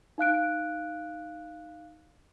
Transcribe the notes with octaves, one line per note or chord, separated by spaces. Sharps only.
D#4 F5 F#6 D7